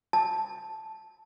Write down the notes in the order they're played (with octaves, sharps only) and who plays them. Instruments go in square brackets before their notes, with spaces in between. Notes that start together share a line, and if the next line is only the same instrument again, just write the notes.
[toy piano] A5